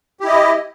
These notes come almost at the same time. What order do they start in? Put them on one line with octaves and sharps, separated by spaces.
G4 E4 D#5